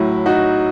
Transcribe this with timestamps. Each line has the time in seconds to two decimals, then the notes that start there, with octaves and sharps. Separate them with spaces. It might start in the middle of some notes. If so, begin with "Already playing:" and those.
Already playing: A2 F#3 E4
0.26 D#4 F#4